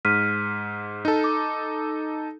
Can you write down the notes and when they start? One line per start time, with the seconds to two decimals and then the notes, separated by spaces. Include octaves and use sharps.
0.05 G#2 F6 B6 D#7
1.05 D#4 A4
1.24 D6